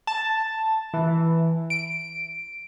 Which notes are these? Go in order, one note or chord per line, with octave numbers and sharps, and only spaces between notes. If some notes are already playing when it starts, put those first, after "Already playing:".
A5
E3
D7